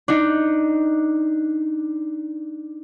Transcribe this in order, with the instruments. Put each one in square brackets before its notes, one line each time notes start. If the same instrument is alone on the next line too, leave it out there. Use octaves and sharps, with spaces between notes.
[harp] D4 D#4